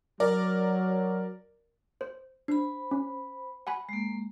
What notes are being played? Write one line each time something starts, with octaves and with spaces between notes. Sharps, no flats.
F#3 A#4 D5
C5
D4 C5 B5
C#4
F#5 G#5 B5
G#3 A#3